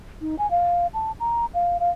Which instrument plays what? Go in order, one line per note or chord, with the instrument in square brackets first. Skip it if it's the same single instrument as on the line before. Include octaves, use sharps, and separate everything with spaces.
[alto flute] D#4
G#5
F5
A5
A#5
F5
F5